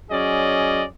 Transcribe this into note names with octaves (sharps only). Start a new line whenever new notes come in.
F#3 C#4 G#4 D5 D#5